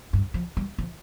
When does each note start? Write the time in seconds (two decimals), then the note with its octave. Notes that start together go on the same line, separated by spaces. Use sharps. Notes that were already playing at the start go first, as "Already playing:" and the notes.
0.13 G2
0.34 F3
0.57 G3
0.78 F3